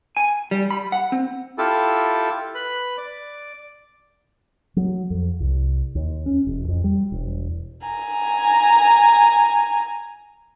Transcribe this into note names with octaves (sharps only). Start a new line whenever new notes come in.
G#5
G3
B5
F#5
C4
E4 F4 G4 A4
B4 B5
D5
F#3
F2
C2
D#2
C#4
E1
F2
G3
E1
G#5 A#5